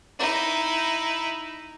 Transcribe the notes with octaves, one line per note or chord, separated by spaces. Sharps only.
D#4 E4